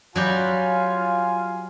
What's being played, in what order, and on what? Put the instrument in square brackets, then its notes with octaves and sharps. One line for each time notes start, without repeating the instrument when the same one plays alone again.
[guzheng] F#3 G3 G4 [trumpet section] F4 F5 G#5